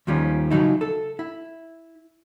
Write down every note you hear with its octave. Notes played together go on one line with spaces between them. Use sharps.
D#2 D#3 F3 G3 C#4
C#3 F3 F#3 D#4 E4
A4
E4